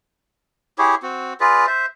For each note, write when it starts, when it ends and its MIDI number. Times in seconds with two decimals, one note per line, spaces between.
0.78 0.95 64
0.78 0.95 67
0.78 0.95 68
0.78 0.95 73
1.03 1.33 60
1.03 1.33 66
1.40 1.66 65
1.40 1.66 68
1.40 1.66 71
1.40 1.66 74
1.67 1.86 72
1.67 1.86 76